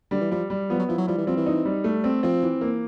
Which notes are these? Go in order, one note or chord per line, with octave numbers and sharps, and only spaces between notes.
D3 G3
E3
F3 G3
G3
F3 B3
F#3
F3 E4
F#3
F3 G3
E3
F3 C4
E3
D#4
G3
A3
C4
F3 C4
E3
A#3